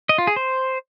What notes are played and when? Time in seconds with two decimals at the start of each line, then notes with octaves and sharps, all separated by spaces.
0.09 D#5
0.18 F4
0.27 G#4
0.36 C5